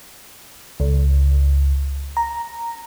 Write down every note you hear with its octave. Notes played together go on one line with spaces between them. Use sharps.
C#2
A#5